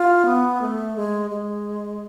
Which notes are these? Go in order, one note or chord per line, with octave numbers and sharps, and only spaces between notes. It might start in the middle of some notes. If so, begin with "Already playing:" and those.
Already playing: F4
B3
A3
G#3
G#3